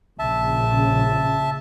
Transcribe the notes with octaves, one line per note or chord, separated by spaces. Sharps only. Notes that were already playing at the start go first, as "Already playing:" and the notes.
A#1 C#3 E5 A5